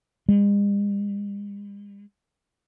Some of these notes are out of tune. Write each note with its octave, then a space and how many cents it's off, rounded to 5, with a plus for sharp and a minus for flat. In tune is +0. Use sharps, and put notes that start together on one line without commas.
G#3 -45